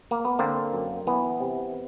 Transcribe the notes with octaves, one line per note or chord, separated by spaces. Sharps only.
A#3
B3
D3 A#3 C4
F#2
E3 B3
C3